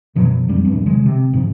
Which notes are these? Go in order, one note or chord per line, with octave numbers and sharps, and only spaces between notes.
F#2 B2 F3 F#3
F2 G3 A3 C4
A#1 E2 G2
C3 D#3 F#3 G#3
C3
G#2 C#3 F3